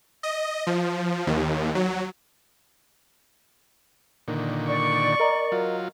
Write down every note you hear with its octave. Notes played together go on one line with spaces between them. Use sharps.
D#5
F3
D#2
F#3
A#2 D3 D#3
D5 C#6
A#4 D#5 A#5
F#3 F4